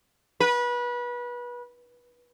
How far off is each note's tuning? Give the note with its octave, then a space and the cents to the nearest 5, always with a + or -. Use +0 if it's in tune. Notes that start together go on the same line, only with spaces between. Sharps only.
B4 -25